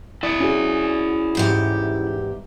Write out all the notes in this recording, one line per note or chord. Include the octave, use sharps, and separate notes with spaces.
E4 D5
C#4 F#4 G#4
E2 G#2 G4